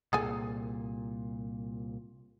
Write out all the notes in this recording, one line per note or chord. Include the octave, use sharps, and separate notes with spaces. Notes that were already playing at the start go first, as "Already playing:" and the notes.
C2 A#2 G#4 A4 G#5